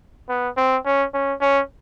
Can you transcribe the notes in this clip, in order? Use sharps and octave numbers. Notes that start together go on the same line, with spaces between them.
B3
C4
C#4
C#4
C#4